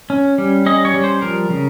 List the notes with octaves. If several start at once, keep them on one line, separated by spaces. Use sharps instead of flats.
C#4
G3
C#4 D#5
C#5
G3
C5
F3 A#4
C#3